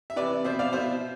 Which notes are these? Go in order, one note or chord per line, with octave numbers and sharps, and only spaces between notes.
E5
C3 E3 B4 D5
B2 C5 E5
D5 F5
B2 C5 E5